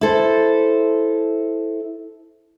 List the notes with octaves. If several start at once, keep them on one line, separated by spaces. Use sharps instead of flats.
E4 A4 C5